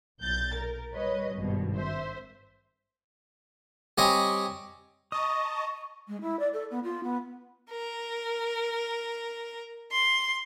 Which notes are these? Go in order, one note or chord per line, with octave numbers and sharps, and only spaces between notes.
B1 A#2 G6 A6
A#4
G3 B4 C#5 D#5
G#1 G2 B2
C5 E5
G3 C4 C#5 D#5 G#5
D#5 A5 A#5 C#6 D#6
G#3
E4
D5
A4
B3
F4
B3
A#4
C6